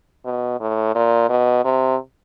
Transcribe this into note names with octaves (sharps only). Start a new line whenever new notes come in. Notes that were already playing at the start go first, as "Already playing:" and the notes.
B2
A2
A#2
B2
C3